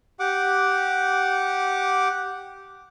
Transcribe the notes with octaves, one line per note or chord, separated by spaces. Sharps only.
G4 F#5 D6